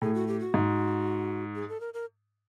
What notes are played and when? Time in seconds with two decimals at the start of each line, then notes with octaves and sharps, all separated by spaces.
0.02 A2 G#4
0.14 F#4
0.28 G4
0.40 F#4
0.54 G#2
1.55 G#4
1.69 A4
1.80 A#4
1.94 A#4